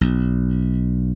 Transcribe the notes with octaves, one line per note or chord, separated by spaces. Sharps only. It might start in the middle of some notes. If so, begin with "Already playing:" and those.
B1